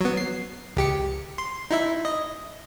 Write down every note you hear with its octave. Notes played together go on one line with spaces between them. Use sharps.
F#3 B3
C7
C#2 G4 C#7
C6
D#4 E4 E5
D#5